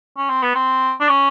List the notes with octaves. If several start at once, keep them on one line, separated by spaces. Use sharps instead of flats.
C#4
C4
B3
C4
D4
C#4